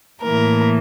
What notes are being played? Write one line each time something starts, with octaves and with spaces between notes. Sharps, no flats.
A2 E3 A#3 A#4